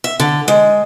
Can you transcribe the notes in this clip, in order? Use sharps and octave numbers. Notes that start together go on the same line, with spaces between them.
E5
D3
G#3